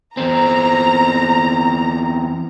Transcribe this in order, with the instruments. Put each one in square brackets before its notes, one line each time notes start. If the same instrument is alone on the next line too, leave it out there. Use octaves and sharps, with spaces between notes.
[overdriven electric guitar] E2 C4 [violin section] A#5